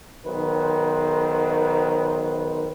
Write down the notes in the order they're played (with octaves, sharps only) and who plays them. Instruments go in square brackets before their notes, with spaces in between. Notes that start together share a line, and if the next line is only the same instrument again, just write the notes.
[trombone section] B1 D#3 B4 C5